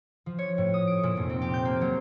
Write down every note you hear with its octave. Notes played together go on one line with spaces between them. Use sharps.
F3
C#5
A2
D#6
D7
A#2
F1
C4
G4
G6
A#3
F#3